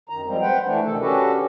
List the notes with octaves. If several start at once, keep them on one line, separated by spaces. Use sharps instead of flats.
F#2 D#3 A#5
F3 G3 G#3 C4
B4 C5 F#5 G5
E3 A3 D4
D2 C3 D#3 E3 A4
C#4 D4 F#4 G4 A4 B4